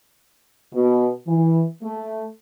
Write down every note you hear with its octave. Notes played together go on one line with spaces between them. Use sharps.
B2
E3
A3